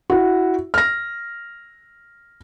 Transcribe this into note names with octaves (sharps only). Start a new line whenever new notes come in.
E4 F#4
F6 A#6